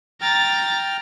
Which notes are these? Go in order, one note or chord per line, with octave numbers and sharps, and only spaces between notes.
G5 A#5 F6 A6